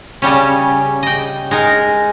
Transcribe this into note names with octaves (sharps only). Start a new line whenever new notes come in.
C#3 G3 C#4
D#5 G5
G#3 D#4 A#4